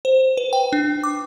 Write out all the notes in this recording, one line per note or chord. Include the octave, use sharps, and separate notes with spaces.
C5
B4
G5
D4
D6